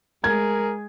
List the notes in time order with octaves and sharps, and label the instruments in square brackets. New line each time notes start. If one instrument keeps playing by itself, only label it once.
[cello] G#3 G#4 [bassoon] A#4 [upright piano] G#6